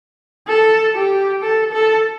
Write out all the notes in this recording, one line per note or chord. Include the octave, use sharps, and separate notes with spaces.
A4
G4
A4
A4